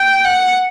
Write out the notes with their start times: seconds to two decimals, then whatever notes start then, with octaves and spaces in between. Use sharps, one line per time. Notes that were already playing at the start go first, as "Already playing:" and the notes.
Already playing: G5
0.25 F#5